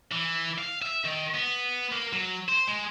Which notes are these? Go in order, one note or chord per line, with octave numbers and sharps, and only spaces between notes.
E3
F5
E5
D#3
B3
A#3
F#3
C5
G#3